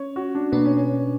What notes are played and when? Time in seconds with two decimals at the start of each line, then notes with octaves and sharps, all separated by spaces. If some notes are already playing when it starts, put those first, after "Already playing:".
Already playing: C#4 C#5
0.16 F#4
0.35 D4
0.52 B2 A#3 B3 D4
0.65 C#4
0.77 C#4